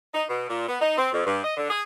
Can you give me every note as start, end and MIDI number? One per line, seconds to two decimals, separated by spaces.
0.14 0.24 63
0.28 0.49 47
0.50 0.66 46
0.68 0.78 59
0.81 0.96 63
0.97 1.08 60
1.13 1.24 41
1.26 1.40 43
1.43 1.55 75
1.57 1.66 50
1.70 1.82 68